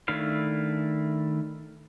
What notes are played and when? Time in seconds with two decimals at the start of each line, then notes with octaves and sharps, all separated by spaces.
0.08 D#3 A3 D4 E4 F5